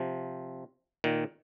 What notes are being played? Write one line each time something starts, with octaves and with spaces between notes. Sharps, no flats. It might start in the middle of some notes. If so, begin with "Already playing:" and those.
Already playing: C3 F3
A#2 D#3